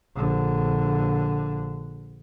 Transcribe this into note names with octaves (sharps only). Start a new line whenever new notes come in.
A#1 D3